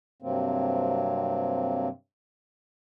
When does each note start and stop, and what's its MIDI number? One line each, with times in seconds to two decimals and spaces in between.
0.22 1.88 43
0.22 1.88 48
0.22 1.88 54
0.22 1.88 58
0.22 1.88 60